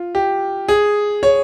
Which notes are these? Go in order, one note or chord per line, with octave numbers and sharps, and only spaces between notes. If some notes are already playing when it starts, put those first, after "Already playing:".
Already playing: F4
G4
G#4
C#5